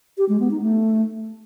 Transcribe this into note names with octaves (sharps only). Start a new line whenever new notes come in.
G4
G#3
B3
D#4
A3